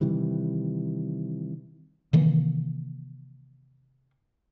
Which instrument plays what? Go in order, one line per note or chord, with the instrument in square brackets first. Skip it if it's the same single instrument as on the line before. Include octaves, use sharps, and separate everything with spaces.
[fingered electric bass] C3 D#3 E3 G3
[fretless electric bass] C3 D#3 E3 A#3